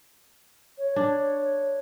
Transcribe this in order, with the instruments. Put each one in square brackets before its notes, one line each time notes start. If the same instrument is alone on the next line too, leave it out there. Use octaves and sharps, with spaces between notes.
[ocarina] C#5
[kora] D4